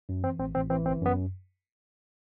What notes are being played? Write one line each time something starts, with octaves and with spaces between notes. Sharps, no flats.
F#2
E3 C4
A1 C4
A1 C4
E3 C4
G1 C4
F#2 B3